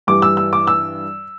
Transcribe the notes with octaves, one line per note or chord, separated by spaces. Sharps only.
G2 E3 G3 D6
E6
E6
D6
E6